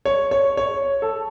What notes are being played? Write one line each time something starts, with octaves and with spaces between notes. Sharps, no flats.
C#5
C#5
C#5
A4